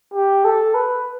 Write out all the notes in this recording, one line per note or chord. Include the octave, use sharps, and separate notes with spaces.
G4
A4
B4